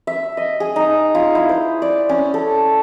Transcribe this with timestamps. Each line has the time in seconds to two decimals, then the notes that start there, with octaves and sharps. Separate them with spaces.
0.07 E5
0.37 D#5
0.60 G#4
0.76 D#4
1.15 F4
1.35 E4
1.49 C5
1.82 D5
2.09 C#4
2.34 A4